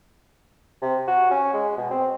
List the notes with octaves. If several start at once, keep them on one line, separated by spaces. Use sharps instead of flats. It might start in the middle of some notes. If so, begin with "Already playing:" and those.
C3
F#4
C#4
G#3
B2
C4